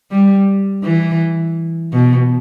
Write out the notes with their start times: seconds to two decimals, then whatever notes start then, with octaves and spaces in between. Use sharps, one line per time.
0.11 G3
0.84 E3
1.93 B2